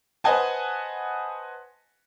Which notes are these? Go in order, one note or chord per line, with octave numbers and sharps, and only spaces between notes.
B4 C5 D#5 F#5 G#5 A5